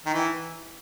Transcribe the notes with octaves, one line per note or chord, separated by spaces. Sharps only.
D#3
E3